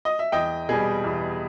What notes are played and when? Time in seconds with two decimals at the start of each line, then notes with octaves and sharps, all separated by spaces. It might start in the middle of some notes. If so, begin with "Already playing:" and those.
0.05 D#5
0.19 E5
0.32 E2 D#5 G5
0.69 B2 G3 G#4
1.04 E2